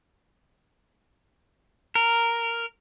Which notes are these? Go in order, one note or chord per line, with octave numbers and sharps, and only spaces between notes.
A#4